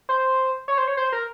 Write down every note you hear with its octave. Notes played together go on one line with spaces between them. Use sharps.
C5
C#5
C5
C#5
C5
A#4